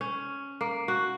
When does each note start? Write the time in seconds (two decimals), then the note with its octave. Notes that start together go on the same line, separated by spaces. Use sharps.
0.01 C#4
0.61 A#3
0.88 F#4